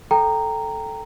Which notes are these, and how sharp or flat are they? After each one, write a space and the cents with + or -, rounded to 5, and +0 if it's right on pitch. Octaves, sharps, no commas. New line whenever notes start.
A4 +0 G5 -5 A#5 -10